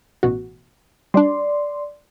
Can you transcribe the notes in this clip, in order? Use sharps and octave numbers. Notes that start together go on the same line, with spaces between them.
A1 B2 F#4
G3 D4 D5 C6